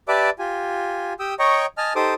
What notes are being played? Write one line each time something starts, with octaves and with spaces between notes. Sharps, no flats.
G4 B4 D5 E5 A5 D6
F4 G4 G#5
G4 G5 D#6 E6
C#5 D#5 G5 A#5 C#6
D#5 G#5 A5 F6
D#4 G4 A4 C5 D6 D#6